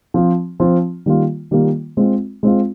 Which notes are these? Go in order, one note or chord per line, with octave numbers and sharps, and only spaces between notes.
F3 C4 F4
F3 C4 F4
D#3 G3 A#3 F4
D#3 G3 A#3 F4
G#3 C4 F4
G#3 C4 F4